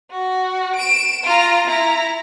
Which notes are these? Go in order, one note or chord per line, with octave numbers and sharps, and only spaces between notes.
F#4
D7 E7
F4 A#5
E4 A#5